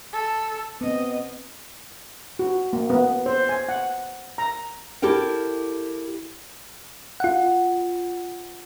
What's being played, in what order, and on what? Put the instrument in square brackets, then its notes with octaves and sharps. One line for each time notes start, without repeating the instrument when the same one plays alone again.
[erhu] A4
[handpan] B3 C4 [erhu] D#5
[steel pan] F#4
A#3
B3
C5
G#5
F#5
A#5
[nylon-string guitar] E4 G4 A4 A#4 G5
[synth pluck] F4 F#5